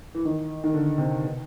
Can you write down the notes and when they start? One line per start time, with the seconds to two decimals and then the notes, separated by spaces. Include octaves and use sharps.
0.15 E3
0.25 D#3
0.64 D#3
0.74 D3
0.98 C3
1.23 B2